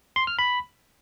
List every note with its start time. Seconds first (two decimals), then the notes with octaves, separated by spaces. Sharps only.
0.16 C6
0.27 F6
0.39 B5